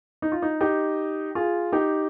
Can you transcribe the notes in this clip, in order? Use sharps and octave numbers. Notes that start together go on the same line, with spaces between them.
D#4
F4
D#4
D#4 G4
F4 G#4
D#4 G4